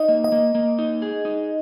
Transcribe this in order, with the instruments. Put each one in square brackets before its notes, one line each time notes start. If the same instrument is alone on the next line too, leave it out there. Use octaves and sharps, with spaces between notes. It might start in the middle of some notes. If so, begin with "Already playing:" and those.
Already playing: [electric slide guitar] D#4 [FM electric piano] D#5
[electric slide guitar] A#3
[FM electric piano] D#5
[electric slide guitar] A#3
A#3
D#4
G#4
D#4